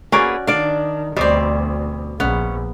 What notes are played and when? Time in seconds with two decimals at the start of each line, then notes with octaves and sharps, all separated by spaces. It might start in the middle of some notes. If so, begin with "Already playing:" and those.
0.12 A#3 B3 C#4 F#4 G#4 D5
0.47 D#3 D4 D5 F5
1.17 D2 B2 G3 C4 C5 D5
2.20 A#1 B3 C#4